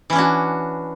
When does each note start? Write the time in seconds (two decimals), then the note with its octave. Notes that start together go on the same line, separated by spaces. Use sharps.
0.10 E3
0.13 C#4
0.16 D4
0.18 F#4